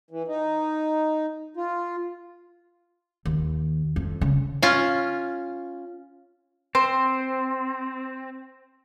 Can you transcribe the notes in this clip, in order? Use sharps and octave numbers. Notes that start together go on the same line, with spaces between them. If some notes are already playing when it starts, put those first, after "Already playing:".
E3
D#4
F4
D#2
F2
C#3
C#4 F4
C4 C5